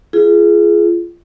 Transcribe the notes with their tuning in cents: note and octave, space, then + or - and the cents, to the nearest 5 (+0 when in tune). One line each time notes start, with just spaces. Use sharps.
F4 -25 G#4 +15